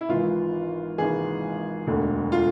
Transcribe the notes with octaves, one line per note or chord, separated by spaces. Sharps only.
E4
G#1 G#2 E3 F4
G#1 G#2 E3 G#4
E1 D2 D3
F4